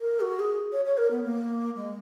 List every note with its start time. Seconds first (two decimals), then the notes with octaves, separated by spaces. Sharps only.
0.01 A#4
0.21 F#4
0.39 G#4
0.72 C#5
0.85 C#5
0.97 A#4
1.11 B3
1.23 A#3
1.76 G#3